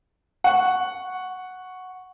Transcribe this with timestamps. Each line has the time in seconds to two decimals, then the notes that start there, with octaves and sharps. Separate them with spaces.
0.44 F#5 C#6